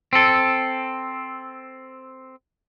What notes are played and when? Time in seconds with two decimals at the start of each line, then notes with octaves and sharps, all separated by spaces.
0.13 C4 A4